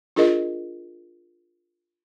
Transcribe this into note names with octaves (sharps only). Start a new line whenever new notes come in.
D4 F4 G#4 A#4 D#5